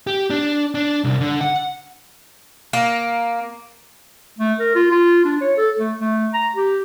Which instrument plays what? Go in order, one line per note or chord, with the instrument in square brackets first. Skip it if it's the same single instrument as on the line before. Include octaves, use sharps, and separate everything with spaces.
[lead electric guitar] G4
D4
D4
C2
D3
F#5
[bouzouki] A#3
[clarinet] A3
A#4
F4
F4
D4
C#5
A4
A3
A3
A#5
G4